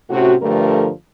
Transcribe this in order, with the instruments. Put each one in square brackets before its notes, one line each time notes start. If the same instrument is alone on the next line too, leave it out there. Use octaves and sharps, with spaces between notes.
[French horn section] A2 C3 C#4 F#4
G2 D3 F3 G3 A3 A#4